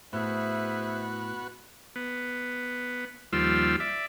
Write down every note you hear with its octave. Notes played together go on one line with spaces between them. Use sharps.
A2 B3 F#4 G#4 C5 E5
B3
D#2 F3 G3 F4 E6
D5 E5